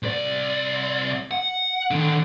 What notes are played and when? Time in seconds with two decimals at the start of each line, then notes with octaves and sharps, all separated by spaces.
0.03 C2 D5
1.31 F#5
1.91 D3 D#3